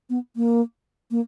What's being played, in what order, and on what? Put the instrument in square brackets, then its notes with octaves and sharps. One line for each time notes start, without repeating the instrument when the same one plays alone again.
[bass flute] B3
A#3
A#3